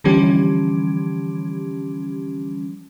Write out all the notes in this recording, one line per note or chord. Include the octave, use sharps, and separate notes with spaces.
D3 E3 F3 G3 C#4 G4